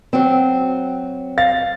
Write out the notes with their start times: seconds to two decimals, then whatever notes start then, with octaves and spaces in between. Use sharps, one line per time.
0.13 F#3 C4
1.37 F5 A6